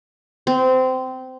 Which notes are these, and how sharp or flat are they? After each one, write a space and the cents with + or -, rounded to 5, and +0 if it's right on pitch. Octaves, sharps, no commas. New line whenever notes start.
C4 -20